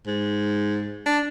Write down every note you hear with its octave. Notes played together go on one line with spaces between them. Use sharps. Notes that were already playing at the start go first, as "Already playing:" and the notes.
G#2
D4